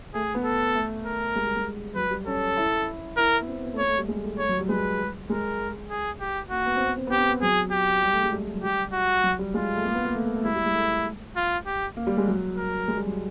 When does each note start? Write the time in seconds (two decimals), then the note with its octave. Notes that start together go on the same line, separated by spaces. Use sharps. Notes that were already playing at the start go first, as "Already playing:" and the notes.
0.14 A3 G#4
0.35 B3
0.44 A4
0.75 A3
1.05 A#4
1.36 G#3
1.46 G3
1.56 G#3
1.96 F#3 B4
2.11 G3
2.26 C#4 A4
2.57 E4
3.17 E4 A#4
3.41 B3
3.48 C4
3.63 B3
3.73 A3
3.78 A#3 C#5
3.88 A3
3.98 G3
4.09 G#3
4.23 A3
4.39 A3 C#5
4.49 F#3
4.59 G3
4.69 G#3 B4
5.29 G#3 A#4
5.90 G#4
6.21 G4
6.51 A#3 F#4
6.66 B3
6.76 C4
6.86 B3
6.97 C4
7.07 B3 G4
7.18 C4
7.29 B3
7.42 F#3 G#4
7.72 G4
8.03 G3
8.12 A3
8.23 G#3
8.32 G3
8.43 G3
8.53 F#3
8.63 G3 G4
8.93 F#4
9.24 F#3
9.39 G3
9.54 G#3 F4
9.75 A3
9.85 A#3
9.95 B3
10.05 A#3
10.14 A3
10.25 A3
10.35 A3
10.45 G#3 E4
10.55 G3
10.66 G#3
10.75 A3
11.37 F4
11.66 G4
11.97 A#3
12.07 G3
12.17 G#3
12.27 F#3
12.57 A#4
12.88 G#3
12.97 G3
13.06 F#3